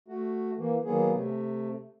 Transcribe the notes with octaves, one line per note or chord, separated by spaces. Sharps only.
A3 F#4
E3 A#3
D#3 F#3 A#3 B3 G#4
C3 A3